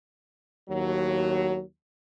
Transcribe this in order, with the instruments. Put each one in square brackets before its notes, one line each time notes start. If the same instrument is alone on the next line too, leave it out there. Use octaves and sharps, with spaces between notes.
[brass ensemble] D#2 A2 F#3